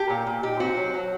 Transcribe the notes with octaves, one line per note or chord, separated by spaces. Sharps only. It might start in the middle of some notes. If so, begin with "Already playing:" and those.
Already playing: G4
A#2
A#2
D#4 G4
C4 F#4
F#3
F#3